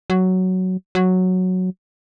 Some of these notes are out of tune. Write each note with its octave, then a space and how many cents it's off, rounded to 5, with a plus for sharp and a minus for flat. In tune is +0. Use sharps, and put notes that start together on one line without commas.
F#3 +5
F#3 -5